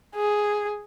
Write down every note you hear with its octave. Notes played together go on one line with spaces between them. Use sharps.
G#4